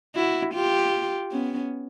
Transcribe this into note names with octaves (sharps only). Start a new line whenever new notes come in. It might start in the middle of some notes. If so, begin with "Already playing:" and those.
E4 F#4
F4 G4
B3 C#4